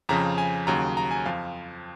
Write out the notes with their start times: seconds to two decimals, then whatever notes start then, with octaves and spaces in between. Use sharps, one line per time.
0.09 F2 C#3 F3 A#5
0.38 G#5
0.67 D#2 C#3 F#3 A#5
0.97 A#5
1.11 G#5
1.26 F2 F3 F5